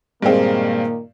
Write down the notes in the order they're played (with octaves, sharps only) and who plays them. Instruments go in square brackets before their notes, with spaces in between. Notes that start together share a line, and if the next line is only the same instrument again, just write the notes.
[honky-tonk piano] G2 G#3 C4 [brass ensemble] A#2 D#3 A#3